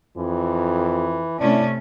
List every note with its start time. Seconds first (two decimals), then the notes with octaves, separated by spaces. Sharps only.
0.17 F2 E3
1.40 C3 A3 C#4 D4 E4